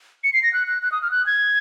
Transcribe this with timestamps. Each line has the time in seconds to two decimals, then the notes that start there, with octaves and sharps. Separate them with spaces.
0.24 C#7
0.33 C7
0.43 A#6
0.53 F#6
0.68 F#6
0.82 F#6
0.92 D#6
1.02 F6
1.11 F#6
1.26 G#6